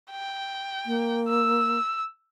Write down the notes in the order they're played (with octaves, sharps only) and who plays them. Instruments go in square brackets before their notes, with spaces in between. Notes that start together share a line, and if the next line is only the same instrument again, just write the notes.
[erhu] G5
[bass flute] A#3
[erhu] E6